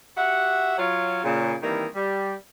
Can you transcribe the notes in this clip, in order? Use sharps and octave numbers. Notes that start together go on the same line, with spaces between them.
F#4 G4 E5 F#5
F#3 F4 C#5
A#2 C#3
D#3 E3 G3 A#3 C4 D#4
G3